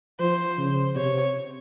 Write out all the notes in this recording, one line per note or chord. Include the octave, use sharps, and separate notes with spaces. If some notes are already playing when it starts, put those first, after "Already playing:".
F3 C5
C#3
C3 C#5